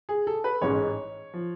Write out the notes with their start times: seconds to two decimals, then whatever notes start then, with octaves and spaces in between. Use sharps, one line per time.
0.09 G#4
0.27 A4
0.44 B4
0.61 A1 G#2 G#3 C#4 C#5
1.34 F3